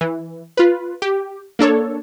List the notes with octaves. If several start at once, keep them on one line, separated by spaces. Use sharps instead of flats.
E3
F4 B4
G4
A#3 D4 A4 C#5